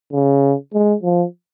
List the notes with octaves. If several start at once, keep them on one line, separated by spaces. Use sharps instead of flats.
C#3
G#3
F3